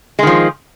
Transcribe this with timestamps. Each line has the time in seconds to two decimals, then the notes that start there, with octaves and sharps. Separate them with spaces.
0.19 G#3
0.23 D#3
0.27 F3